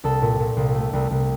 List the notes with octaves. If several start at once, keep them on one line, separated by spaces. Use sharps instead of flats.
C2 A4 A5
A#2
A#2
C2
A3
C2
C2